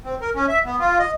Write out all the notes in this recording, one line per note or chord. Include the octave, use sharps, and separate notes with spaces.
C4
A#4
C#4
E5
B3
F4
D#5